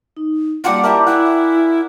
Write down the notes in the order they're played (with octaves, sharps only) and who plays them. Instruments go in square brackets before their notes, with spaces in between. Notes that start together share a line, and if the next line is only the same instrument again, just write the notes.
[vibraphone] D#4
[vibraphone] G3 A#3 A5 [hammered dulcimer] F4 G4 D5 [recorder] F#5
[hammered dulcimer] E4 G4 A#4 [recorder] E5 [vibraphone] A5 A#5
[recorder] E4 [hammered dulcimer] F#5 [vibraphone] G#5